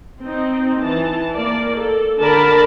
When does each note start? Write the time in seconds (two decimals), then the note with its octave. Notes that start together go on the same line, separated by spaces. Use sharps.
0.22 C4 D#4
0.81 E3 A5
1.33 A#3 D5
1.76 A4
2.19 D3 A#4 D5 A5 B5